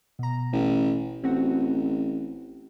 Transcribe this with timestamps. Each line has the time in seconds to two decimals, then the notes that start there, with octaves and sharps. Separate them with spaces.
0.19 B2 A#5
0.53 A1
1.24 A1 C4 F#4